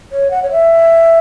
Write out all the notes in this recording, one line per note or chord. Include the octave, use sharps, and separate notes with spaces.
C#5
F#5
C#5
E5